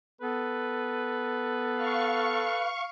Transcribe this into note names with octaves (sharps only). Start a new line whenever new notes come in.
B3 A4 B4
F5 C#6